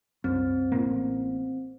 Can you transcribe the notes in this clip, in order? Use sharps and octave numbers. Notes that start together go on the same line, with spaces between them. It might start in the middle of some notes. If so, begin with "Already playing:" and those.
C2 F#2 C4
A1 A2 A#3